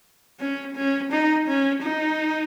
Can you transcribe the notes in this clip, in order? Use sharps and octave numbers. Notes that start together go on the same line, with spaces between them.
C#4
C#4
D#4
C#4
D#4